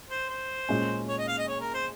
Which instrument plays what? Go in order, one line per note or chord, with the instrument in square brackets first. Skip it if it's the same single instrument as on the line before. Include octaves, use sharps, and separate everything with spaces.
[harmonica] C5
C5
[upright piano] A#2 G#3 C#4
[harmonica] C#5
D#5
F5
D#5
C#5
A#4
C5